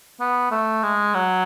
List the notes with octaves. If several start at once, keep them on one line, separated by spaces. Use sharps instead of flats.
B3
A3
G#3
F#3